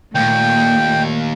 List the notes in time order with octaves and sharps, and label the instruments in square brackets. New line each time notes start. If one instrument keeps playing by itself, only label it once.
[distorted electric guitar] D#2 [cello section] A#2 A3 [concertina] G5